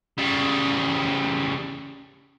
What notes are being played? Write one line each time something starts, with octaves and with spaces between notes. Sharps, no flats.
C#3 G3